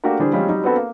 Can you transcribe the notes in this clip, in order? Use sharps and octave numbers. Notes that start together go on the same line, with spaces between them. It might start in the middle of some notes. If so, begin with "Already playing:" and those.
A3 A#3 D4 F#4 G4 A#4
D3 E3 G3 D4 G#4 C5
F3 G3 G#3 C4 C#4
F#3 G3 D#4
B3 C4 D4 F#4 A4 B4
A#3